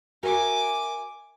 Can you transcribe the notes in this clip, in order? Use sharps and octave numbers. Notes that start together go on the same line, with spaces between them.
F#4 A#4 E5 G#5 D6